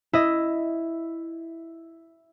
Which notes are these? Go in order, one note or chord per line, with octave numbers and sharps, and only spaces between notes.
E4 D#5